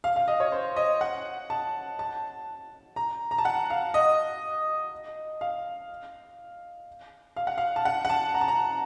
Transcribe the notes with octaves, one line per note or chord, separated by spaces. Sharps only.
F5
F5
D#5
C#5
C5
D#5
F#5
A5
A5
A#5
A#5
A5
F#5
F5
D#5
F5
F5
F#5
F5
A5
F#5
F#5
A5
A#5
A5
A#5